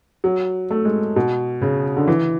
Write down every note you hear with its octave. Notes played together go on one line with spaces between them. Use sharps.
F#3
A3
G#3
B2
C#3
D3
E3